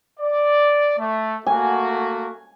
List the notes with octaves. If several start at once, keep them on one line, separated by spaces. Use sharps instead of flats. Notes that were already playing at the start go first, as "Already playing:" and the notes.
D5
A3
A3 A#3 F#4 G#5